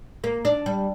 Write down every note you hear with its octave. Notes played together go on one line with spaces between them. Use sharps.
A#3
D4
G3